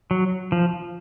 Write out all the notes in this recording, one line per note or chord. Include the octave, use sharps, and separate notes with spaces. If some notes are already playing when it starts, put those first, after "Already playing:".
F#3
F3